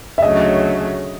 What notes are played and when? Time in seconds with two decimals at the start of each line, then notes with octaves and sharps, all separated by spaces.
0.18 E5
0.22 D2 C#3 F#3 A3 D#5